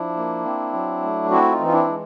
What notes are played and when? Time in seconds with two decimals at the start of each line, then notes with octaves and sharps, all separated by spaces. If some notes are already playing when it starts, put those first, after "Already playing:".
Already playing: F3 D4 E4
0.17 A#3
0.44 C4
0.73 F#3
1.02 A3
1.31 C4 E4 F#4
1.52 D#4 F4
1.59 E3
1.67 F4
1.73 D4 E4
1.87 G#3